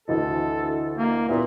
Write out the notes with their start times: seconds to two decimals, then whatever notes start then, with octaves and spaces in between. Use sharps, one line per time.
0.08 D2 E3 A4 D#5
0.97 A#3
1.29 A#2 B3 E4 G4